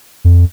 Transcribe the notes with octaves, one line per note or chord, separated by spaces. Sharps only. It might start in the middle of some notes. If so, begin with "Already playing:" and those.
F2